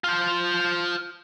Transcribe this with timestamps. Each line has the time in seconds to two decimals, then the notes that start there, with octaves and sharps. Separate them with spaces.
0.04 F4 C5